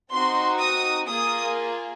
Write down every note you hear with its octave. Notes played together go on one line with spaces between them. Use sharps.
C4 D#4 F#4 C6
D#6
A#3 F4 G#4 D#6